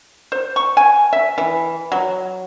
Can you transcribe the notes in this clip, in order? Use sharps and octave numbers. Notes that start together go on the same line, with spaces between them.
C5
C#6
G#5
E5
E3
F#3